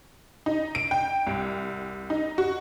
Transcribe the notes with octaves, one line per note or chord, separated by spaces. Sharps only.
D#4
D7
G5
C2
D#4
F#4